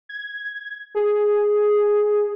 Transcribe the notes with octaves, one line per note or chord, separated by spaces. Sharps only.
G#6
G#4